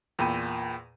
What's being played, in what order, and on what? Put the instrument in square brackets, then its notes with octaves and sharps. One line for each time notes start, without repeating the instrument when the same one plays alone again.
[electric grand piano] E2 A#2 G5 B5 D#7